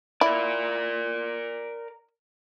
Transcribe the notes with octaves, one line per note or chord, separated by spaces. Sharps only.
E4 A#4 D5